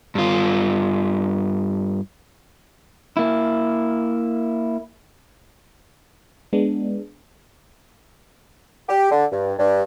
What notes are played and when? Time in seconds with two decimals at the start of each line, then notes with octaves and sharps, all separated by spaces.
0.15 G2 F4
3.17 A#3 E4
6.53 G#3 B3 D4
8.89 G4
9.11 D3
9.32 G2
9.59 G2